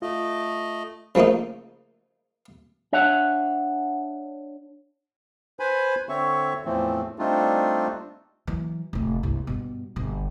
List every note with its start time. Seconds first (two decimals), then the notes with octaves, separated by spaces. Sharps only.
0.02 A3 F4 D#5
1.15 C#3 F3 A3 A#3 D#4
2.93 D4 C#5 E5 F#5
5.60 B4 C5 G#5 B5
6.09 D3 C4 C#5 E5 C#6
6.65 E2 A2 E3 F3 A3 C4
7.19 G3 A3 C4 D4 D#4 F4
8.47 E3 F#3
8.93 F1 A2
9.23 C2 G2
9.47 G2 B2
9.96 G1 B2